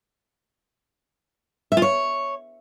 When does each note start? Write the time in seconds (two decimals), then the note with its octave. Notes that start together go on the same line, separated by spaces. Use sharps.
1.72 E5
1.77 F4
1.82 C#5